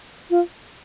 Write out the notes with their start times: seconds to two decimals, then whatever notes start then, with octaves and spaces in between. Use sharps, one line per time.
0.30 F4